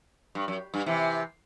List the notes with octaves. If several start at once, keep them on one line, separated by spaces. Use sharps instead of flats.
G2
F#2
G2
C3 E3